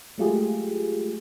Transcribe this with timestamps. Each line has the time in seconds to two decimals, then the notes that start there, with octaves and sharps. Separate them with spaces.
0.18 F#3 G#3 A3 F4 G4 G#4